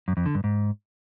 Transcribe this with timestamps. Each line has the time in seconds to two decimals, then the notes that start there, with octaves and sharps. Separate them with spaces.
0.08 F#2
0.17 F2
0.26 D3
0.35 G2
0.44 G#2